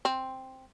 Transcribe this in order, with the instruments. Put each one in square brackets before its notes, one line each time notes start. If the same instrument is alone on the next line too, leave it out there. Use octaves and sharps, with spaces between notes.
[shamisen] C4